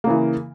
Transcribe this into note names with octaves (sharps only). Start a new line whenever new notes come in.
C#3 E3 A#3